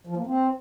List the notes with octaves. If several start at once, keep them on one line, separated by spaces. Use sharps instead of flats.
F3
A#3
C4